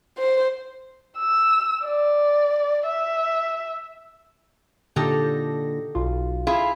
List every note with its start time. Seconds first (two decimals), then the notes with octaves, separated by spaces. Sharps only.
0.18 C5
1.18 E6
1.85 D5
2.87 E5
4.96 A#2 D3 D#4 G4 A4 A#6
5.95 B1 F4
6.47 E4 F4 G#4